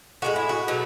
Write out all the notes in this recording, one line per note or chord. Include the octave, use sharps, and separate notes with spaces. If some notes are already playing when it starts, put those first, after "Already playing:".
A2 E3 G#3 F#4
E4
F#4
B2 F#3 A3